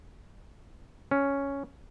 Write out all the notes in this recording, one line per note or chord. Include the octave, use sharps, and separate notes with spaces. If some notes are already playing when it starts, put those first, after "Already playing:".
C#4